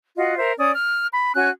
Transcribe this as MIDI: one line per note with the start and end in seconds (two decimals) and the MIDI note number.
0.17 0.38 65
0.17 0.38 66
0.17 0.38 75
0.17 0.38 78
0.38 0.52 70
0.38 0.52 72
0.38 0.52 76
0.59 0.71 61
0.59 0.71 74
0.59 0.71 87
0.73 1.07 89
1.12 1.33 83
1.34 1.49 61
1.34 1.49 66
1.34 1.49 80
1.34 1.49 90